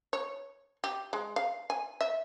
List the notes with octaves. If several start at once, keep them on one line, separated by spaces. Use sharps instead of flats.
C#5
G4
G#3
F5
G#5
E5